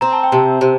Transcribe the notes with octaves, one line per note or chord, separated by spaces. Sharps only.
C4 A#5
A5
G5
C3 A5
C3 C5